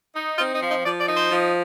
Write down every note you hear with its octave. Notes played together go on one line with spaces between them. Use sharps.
D#4
C4 F4
D#4
F3
D#4
F3 D5
D5
D#4
C5
F3